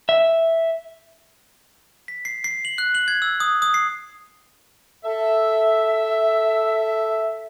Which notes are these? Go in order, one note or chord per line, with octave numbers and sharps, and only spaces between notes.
E5
B6
C7
C7
F#7
F#6
F#7
G#6
E6
D#6
D#6
C7
A4 E5